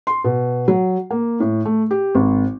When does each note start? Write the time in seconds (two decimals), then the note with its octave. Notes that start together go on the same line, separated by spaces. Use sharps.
0.07 C6
0.24 B2
0.68 F#3
1.11 A#3
1.40 A2
1.65 A3
1.91 G4
2.15 G#1